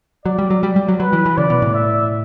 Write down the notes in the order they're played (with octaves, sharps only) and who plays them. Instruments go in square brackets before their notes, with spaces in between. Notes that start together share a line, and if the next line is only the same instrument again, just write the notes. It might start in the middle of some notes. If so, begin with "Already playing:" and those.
[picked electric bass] F#3 [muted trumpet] D5
[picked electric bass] G3
F#3
G3
G3
F#3
[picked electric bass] F#3 [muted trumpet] B4
[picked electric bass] E3
E3
[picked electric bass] C#3 [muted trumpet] D5
[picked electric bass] B2
A2
[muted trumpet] E5